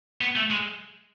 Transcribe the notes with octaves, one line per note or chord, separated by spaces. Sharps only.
B3
A3
G#3